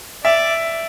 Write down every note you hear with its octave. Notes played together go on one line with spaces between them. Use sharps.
D5 E5